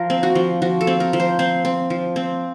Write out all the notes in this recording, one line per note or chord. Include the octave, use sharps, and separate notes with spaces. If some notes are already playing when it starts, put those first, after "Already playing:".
Already playing: F3 A#4
C4
F#4
F3
F3 F#4
A4
C4
A#4
F3
C5
C4 C5
C4
F3
C4